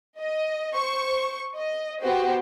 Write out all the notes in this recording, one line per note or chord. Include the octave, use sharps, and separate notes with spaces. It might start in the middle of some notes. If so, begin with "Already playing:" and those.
D#5
C5 C#6
D#5
B3 F#4 G4 C5